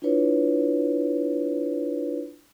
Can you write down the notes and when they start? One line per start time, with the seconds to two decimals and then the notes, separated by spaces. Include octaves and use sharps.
0.02 D4 E4 F4 B4 C#5